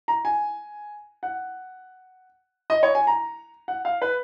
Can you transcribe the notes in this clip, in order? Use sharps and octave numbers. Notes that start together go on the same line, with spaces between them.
A#5
G#5
F#5
D#5
C#5
G#5
A#5
F#5
F5
B4